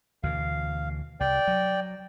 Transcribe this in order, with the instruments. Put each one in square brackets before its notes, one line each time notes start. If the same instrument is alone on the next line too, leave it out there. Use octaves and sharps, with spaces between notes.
[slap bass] D2 B2 E3 [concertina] F5
[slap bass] C2 [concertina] D5 G5
[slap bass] F#3